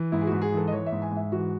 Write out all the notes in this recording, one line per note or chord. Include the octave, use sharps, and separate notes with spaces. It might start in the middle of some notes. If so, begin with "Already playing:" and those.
Already playing: E3
G#2 E4
G#4
G#2 F#4
G#4
E3 A4
D#5
E3 C#5
E5
G#2
G#5
G#2 E5
E3 F#4